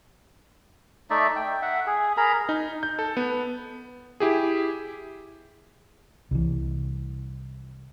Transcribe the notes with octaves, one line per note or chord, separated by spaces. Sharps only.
A3 D#4 D5 E5
G5
E5 F#5
G#4
G#4 A#4 A#5 B5
D#4
G6
A4
B3
E4 G4 G#4
C2 E3